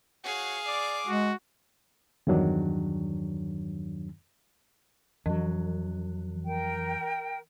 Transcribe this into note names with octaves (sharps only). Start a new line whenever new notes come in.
F#4 G#4 C#5 F5 F#5
D5 D6
G#3 F#4
E2 G2 D#3 F#3 D4
F2 E3 F#3
A#4 G5